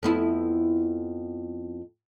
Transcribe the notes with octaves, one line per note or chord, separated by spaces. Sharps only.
F2 B3 E4